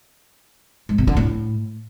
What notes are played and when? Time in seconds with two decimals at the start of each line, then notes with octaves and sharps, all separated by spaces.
0.89 G#2
0.98 B2
1.07 D3
1.17 A2